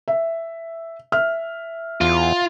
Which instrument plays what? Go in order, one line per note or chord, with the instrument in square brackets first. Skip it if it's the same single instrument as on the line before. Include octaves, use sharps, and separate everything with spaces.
[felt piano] E5
E5 F6
[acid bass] E2 [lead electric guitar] F4